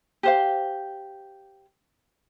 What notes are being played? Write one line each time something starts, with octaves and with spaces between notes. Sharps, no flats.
G4 C5 F5